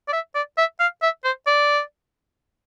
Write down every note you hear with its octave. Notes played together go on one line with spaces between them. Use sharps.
D5
E5
D5
E5
F5
E5
C5
D5